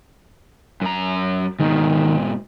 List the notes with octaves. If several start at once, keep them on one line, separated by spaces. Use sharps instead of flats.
F#2 A#5
G#2 B2 D#3